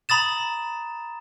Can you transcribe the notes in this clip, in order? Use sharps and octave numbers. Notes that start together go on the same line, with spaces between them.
A#5 B5 D#6 A6 E7